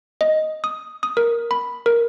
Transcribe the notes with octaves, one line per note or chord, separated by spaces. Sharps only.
D#5
D#6
D#6
A#4
B5
A#4